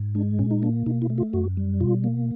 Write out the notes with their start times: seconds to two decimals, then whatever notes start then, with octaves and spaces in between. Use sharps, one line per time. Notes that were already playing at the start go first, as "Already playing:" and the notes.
Already playing: G#2
0.15 G#3 D4
0.39 A#2 C#4
0.51 D#4
0.62 A#3 D4
0.86 B2 D#4
1.02 E4
1.10 A3
1.18 F4
1.33 F#2 F#4
1.57 G3
1.80 B2 F4
2.04 A#3